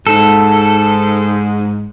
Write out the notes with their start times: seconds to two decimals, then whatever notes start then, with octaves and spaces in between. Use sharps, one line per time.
0.07 G#2 A4